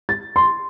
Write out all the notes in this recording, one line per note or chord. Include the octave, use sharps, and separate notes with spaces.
A6
C6